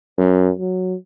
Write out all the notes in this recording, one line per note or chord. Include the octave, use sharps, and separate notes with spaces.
F#2
F#3